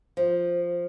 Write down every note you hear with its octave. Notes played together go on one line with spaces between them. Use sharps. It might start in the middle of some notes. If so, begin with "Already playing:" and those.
F3